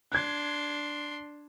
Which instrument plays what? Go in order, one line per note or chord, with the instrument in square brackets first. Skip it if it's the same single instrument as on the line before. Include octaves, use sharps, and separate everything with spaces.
[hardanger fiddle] D4 C6 [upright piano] F#6 G#6